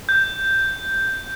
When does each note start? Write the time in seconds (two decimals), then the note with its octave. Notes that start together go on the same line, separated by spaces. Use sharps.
0.09 G6